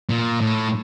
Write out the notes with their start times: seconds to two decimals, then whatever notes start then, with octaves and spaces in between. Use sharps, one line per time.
0.09 A#2
0.41 A2